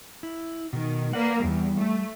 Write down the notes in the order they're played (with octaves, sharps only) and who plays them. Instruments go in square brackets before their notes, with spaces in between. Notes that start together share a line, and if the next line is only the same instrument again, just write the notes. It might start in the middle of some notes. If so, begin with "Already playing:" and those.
[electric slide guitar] E4
[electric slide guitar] B2 A#4 [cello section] D#3
[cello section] A#3 [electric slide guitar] B4 D5 F#5
[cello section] E2 [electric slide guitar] G3
[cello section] A3